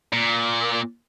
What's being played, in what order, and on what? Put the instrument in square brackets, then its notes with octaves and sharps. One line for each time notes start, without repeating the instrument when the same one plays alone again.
[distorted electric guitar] A#2